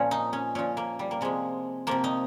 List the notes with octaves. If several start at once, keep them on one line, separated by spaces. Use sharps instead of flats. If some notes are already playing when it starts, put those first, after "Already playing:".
Already playing: A#2 F3 C#4
D#4
C#4
A#2 F3 C#4
A#3
G3
A#3
C3 F3 G#3
C3 F3 A#3
D#4